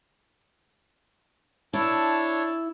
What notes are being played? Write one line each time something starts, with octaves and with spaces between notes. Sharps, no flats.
D4 E4 C#5 A5